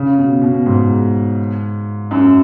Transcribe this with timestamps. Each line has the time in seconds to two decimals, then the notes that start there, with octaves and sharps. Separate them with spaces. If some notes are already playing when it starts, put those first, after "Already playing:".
Already playing: C#3
0.18 B2
0.42 B2
0.66 G#2
2.11 F#2